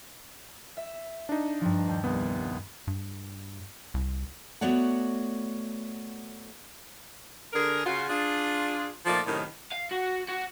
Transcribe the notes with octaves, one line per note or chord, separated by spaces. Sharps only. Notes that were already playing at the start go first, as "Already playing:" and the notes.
E5
D4 D#4
G2 F3
D#2 G6
C2 B3
G2
C2
A3 B3 F#4 C#5 D5 F#5
D3 G#4 A#4
C#3 F4 F#4
D4 F4 G#4
A#2 F3 A3 A#3 D#4 D5
F#2 A2 C3 D#3
F5
F#4
F#4